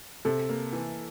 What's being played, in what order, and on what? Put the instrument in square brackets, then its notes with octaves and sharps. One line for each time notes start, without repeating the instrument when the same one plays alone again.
[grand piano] C3 [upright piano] A4
[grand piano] A#3
E3